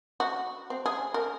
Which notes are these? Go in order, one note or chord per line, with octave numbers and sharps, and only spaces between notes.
F#4
C4
G#4
A#4